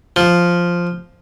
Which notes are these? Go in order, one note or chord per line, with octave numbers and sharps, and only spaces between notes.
F3